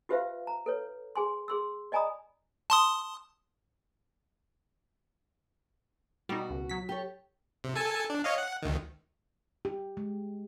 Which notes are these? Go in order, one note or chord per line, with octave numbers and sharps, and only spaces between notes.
F4 G4 B4 C5 E5 F5
A#5
A4 B4 C#5
G#4 G#5 C6
G#4 C6 E6
D5 D#5 G#5 A#5 B5 D#6
A5 C6 D#6
B2 G3 D#4 F#4
C#2
F#3 B6
G4 A4 C#5
C3
A4 G#5 A5
D4
C#5 D#5 F5
F#5
D2 D#3
G4
G#3